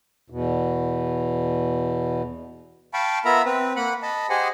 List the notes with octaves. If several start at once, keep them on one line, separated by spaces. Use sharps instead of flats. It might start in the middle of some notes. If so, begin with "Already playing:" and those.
E2 B2
F5 G5 A5 B5 C#6
B3 F4 A#4 E5 A#5 B5
C4 B4
A#3 F#5 B5 F#6
D#5 A5 B5
G4 G#4 C5 D#5 F#5 G#5